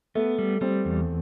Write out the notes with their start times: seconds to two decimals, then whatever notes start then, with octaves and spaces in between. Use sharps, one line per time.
0.15 A3 B3
0.38 G3
0.61 G3 C4
0.85 E2